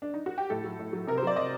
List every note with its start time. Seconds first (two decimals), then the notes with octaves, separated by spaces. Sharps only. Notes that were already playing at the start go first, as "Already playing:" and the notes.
0.02 D4
0.14 D#4
0.26 F#4
0.38 G4
0.50 A2 A4
0.64 F#3
0.79 A2
0.93 F#3
1.07 C3 A#4
1.18 C5
1.23 F#3 D5
1.36 C3 D#5